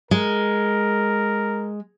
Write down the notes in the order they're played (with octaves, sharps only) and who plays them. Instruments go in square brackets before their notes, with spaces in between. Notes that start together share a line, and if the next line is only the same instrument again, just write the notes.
[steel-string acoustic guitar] G#3 [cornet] A#4